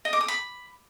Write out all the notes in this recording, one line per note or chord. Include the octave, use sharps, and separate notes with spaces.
D#5
D6
D#6
B5